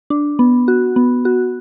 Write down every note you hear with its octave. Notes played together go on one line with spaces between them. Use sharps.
D4
B3
F#4
B3
F#4